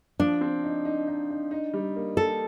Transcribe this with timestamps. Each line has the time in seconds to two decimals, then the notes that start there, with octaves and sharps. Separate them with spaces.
0.19 F3 D4
0.41 C4
0.63 D#4
0.85 D#4
1.07 D#4
1.30 D#4
1.51 D#4
1.73 G3
1.96 A#3
2.17 A#3 A4